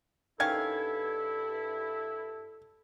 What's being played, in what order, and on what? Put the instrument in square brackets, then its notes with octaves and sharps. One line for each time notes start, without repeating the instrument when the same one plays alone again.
[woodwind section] G2 E4 [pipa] D#3 C#4 F5 [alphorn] A4 [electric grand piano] G#6